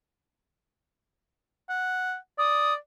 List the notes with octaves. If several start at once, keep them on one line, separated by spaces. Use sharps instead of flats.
F#5
D5 D#6